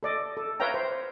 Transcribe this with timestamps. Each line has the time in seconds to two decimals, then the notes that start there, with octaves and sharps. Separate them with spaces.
0.03 A4 D5 D#5
0.37 A4
0.60 B4 C#5 E5 F5 G5 A#5
0.74 C5